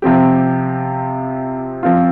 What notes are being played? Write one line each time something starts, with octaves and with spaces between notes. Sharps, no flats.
C3 F3 C4 G4
F3 C4 F4